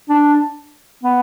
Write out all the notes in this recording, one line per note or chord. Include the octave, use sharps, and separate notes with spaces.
D4
B3